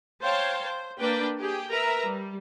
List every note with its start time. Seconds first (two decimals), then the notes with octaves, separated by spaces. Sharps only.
0.23 C5 C#5 F5 G5 A5
0.66 C5
1.00 A#3 D4 B4 G5
1.38 G4 G#4 G5
1.70 A#4 B4 E5 A#5
2.05 G3